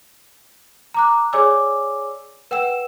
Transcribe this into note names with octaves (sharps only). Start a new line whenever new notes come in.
A#5 D6 F#6
G#4 C#5 D5 G#5 D6 E6
B4 F#5 G5 E6 E7